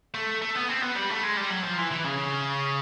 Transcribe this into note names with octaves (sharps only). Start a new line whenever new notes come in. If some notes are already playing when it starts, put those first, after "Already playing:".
A3
A3
B3
C4
B3
G3
A3
G#3
G3
F#3
F3
E3
E3
C#3